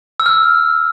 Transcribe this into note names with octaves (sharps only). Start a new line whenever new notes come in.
E6
F6